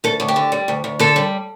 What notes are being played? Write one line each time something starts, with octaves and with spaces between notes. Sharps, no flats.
D2 A4
D2
G4
D3
G3
D2
D2
D3 A4
G3